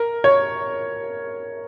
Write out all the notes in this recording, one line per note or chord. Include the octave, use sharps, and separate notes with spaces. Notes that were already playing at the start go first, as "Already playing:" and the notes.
Already playing: A#4
C#5